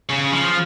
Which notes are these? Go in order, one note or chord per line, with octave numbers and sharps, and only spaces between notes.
C#3
F3